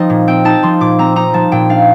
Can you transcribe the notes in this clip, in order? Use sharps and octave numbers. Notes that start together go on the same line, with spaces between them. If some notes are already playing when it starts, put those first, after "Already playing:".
Already playing: F3 C4 D#4 D#5
A#2
C4 G5
D#4 A5
F3 C6
A#2 D6
C4 A#5
D#4 A#5
F3 A5
A#2 G5
D4 F5